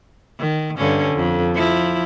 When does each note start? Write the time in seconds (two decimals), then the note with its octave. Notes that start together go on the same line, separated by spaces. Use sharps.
0.40 D#3
0.77 G2 D3 C#4
1.15 F2
1.55 F3 E4